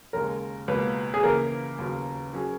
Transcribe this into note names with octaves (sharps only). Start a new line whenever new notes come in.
D#2 C#3 G#3 A#4
C#2 B2 A#3 B4
G#4
C#3 E3 A#3 A#4
D#2 C#3 F#3 B3
F#3 C#4 G#4